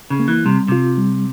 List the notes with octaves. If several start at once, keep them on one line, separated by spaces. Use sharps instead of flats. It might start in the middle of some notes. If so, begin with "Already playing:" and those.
C#3
A#3
E3
C3 G3
C3 F4
G3